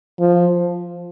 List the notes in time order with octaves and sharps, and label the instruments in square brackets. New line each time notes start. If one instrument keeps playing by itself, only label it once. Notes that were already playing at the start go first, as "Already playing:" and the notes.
[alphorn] F3